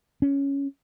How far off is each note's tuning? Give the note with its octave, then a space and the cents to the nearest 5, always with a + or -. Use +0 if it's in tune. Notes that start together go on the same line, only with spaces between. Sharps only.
C#4 +5